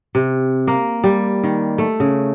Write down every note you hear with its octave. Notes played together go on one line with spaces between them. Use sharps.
C3
A#3
G3
D#3
A3
C#3